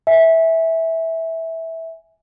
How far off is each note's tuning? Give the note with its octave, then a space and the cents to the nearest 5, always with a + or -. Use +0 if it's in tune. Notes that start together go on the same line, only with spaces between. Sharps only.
E5 -15 G#5 +0